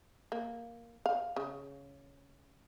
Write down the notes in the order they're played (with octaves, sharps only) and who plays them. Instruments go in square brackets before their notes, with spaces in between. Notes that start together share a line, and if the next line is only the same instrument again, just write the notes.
[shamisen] A#3
F5
C#3